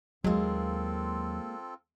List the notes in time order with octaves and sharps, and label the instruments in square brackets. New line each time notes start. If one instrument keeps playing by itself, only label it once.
[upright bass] D#2 [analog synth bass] F#3 [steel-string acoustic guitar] G#3 A#3 [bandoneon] C4 F4 A4